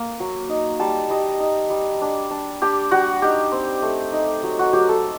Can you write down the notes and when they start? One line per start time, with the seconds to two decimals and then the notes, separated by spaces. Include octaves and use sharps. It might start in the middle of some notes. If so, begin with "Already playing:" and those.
Already playing: A#3
0.20 F#3
0.49 D#4
0.80 G3 A5
1.10 G3 D#5
1.40 D#4
1.70 G3
2.02 D4
2.31 D4
2.62 D4 G4
2.91 G3 F#4
3.22 D#4 G4
3.52 C4
3.82 A3
4.12 D#4
4.43 F#3
4.59 F#4
4.73 F#3 G4
4.89 A4